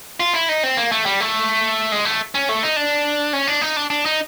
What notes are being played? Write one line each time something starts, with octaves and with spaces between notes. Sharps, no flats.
F4
E4
D#4
C4
A#3
A3
G3
A3
G#3
A3
C#4
A3
D#4
D4
C#4
D4
D#4
D4
D4
D#4